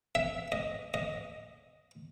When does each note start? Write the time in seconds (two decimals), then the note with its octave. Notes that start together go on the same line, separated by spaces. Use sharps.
0.15 E5
0.52 D#5
0.94 D#5